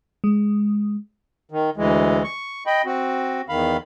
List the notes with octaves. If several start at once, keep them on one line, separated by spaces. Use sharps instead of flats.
G#3
D#3
D2 E3 G#3
C#6
D#5 G5 B5
C4 F#4
E2 D#3 F5 B5